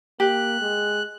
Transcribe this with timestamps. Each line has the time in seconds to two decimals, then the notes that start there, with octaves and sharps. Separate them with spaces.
0.20 A#3 G4 F#6
0.61 G#3